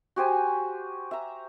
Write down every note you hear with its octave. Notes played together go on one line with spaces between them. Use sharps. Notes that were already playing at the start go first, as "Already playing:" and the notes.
F#4 G4 C5 G#5
E5 A#5